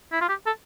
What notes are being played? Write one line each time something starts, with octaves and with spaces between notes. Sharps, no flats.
E4
F4
G4
A4